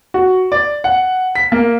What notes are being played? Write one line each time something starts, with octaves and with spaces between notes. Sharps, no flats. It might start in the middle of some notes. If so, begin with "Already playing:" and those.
F#4
D5
F#5
B6
A#3